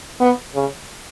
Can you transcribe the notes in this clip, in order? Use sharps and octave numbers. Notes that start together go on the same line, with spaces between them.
B3
C#3